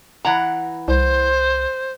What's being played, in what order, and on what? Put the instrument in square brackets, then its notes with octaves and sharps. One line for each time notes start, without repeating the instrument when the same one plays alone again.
[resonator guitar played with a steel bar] E3 F#5 A#5
[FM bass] C2 [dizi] C5